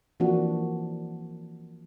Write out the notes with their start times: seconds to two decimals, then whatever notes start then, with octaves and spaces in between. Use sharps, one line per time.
0.20 E3 F3 A#3 D4 F#4